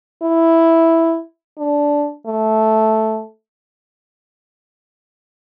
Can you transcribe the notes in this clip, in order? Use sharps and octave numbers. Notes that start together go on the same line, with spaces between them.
E4
D4
A3